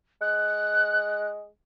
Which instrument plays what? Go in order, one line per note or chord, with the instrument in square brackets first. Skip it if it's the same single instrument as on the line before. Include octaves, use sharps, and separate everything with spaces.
[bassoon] G#3 [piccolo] F#6